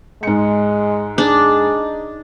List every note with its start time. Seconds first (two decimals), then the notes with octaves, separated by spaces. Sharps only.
0.23 G#2 G#3 C#7
1.18 D4 D#4 G#4